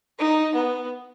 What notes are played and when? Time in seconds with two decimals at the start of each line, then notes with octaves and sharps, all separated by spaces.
0.19 D#4
0.55 B3